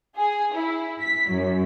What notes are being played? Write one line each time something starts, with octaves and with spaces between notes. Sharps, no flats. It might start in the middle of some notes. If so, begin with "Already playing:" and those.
G#4
E4
B6
F#2